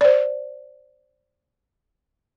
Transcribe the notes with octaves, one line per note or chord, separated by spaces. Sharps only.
C5 D5